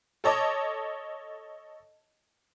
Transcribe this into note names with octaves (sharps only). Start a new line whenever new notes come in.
A4 C#5 D#5 A5 D6